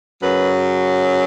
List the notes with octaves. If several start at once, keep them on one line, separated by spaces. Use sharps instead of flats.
F#2 C#3 F#3 B4